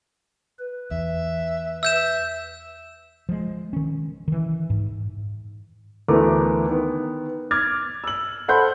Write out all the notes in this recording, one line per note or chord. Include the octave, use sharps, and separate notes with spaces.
B4
E2 E5
E5 E6 G6 E7
F3 G#3
D#3 C#4
D#3 E3
G#2
D2 E3 A3 B3 A#4 D6
D#3 B3
D6 F6 G#6 A6
E6 F#7
A4 C5 F#5 B5 C6 G6